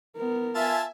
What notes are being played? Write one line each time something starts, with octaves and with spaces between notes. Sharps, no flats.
B3 A#4
F4 E5 G#5 A5